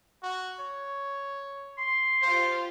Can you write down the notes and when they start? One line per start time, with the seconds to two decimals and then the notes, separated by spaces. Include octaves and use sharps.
0.23 F#4
0.60 C#5
1.78 C6
2.22 F4 G4 C5 F5